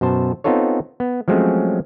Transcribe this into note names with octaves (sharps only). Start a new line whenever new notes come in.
F#2 B2 C5 A5
B3 C4 D#4 F4 A4 C#5
B3
F3 F#3 G#3 A3 C4 C#4